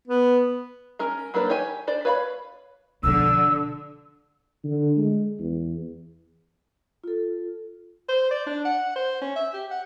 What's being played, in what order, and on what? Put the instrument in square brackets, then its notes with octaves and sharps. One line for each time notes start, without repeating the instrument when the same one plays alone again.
[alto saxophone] B3
[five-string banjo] C#4 A#4 A#5
F#3 A#3 D4 B4 C#5
G4 C#5 G5 G#5
D4 C5 D5
B4 C#5 F5 G#5 B5
[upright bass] B2 F3 [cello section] D3 [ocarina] E6
[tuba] D3
G#3
E2
[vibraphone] F4 A4
[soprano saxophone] C5
D5
D4
F#5
C5
C#4
E5
G4
F#5